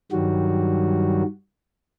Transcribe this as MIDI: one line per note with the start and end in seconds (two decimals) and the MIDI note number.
0.12 1.23 43
0.12 1.23 51
0.12 1.23 54
0.12 1.23 55
0.12 1.23 66